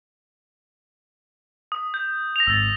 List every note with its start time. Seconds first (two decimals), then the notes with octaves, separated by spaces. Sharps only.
1.72 D#6
1.94 G6
2.36 A#6 F7
2.47 G#1 E6 A6